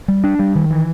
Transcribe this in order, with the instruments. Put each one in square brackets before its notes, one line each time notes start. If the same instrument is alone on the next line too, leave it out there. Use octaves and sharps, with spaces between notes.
[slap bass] G3
D4
G3
D#3
E3